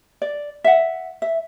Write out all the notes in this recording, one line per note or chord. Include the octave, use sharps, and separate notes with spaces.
D5
E5 F#5
E5